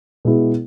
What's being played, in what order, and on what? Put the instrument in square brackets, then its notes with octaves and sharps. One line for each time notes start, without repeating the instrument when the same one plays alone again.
[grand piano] B2 G#3 B3 E4 G#4